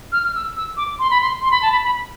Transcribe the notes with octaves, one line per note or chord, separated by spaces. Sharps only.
F6
F6
E6
E6
D6
C6
B5
C6
C6
B5
A5
B5
B5